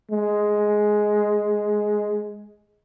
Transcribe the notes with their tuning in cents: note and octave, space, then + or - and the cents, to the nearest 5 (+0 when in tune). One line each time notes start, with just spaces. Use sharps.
G#3 +10